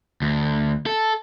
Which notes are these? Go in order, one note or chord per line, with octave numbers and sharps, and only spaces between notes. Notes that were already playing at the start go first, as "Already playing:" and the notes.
D2
A4